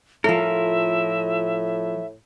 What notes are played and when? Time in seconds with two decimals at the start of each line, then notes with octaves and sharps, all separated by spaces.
0.24 A2 F3 F4 A4 A#4 E5